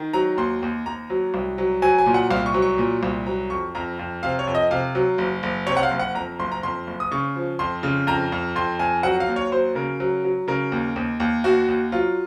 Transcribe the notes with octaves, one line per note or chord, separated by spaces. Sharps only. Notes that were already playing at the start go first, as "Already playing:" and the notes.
Already playing: D#3
F#3 A#5
D#2 C6
D#2
D#2 A#5
F#3
C2
F#3
F#3 G#5
G#5
A#2
F#5
C2 F5
C#6
F#3
C#6
A#2
C2
F#3 A#5
F2 C#6
F2 A#5
F2
C3 F5
C#5
F2
D#5
C3 F5
F#3
F#1
F#1
C3 C#5
F#5
F5
F#1
F#5
F2 A#5
F#1 C6
A#5
F2 C6
F#1
D#6
C#3 C#6
F3
F2 C6
C#3
F2 A#5
F2
F2 C6
F2 G#5
F#3 F#5
F5
D#2
C#5
F#3 C5
C#3 A#4
F#3
F#3
C#3 A#4
D#2
D#2
D#2
D#2 F#4
D#2
F#3 F4